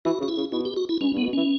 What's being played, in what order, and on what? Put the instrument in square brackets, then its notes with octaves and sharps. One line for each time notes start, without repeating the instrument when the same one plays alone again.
[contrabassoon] E3 [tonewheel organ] F#4
[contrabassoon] C#3
[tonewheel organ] F#4
E4
[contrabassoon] C#3
[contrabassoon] B2 [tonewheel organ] E4
[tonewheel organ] G4
F#4
E4
[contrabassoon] G2 [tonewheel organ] C#4
[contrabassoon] G2
[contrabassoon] A2 [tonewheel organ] B3
[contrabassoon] B2
[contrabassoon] E3 [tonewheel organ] C#4